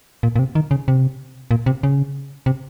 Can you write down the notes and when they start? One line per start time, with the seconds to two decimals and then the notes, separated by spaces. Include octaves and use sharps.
0.23 A#2
0.36 A#2
0.39 C3
0.55 D#3
0.71 C#3
0.88 C3
1.51 A#2
1.66 C3
1.83 C#3
2.46 C3